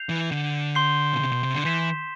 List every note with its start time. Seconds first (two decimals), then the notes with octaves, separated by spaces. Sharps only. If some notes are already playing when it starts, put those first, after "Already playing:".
Already playing: G6 C7 F7
0.09 E3
0.32 D3
0.75 C6 G6 C7 G7
1.13 B2
1.21 C3
1.32 B2
1.43 C3
1.54 D3
1.65 E3 G6 B6 E7